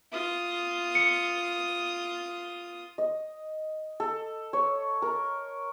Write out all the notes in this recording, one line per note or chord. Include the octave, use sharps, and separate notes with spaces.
F4 D#6
C#7
D#5
A4
C#5
A#4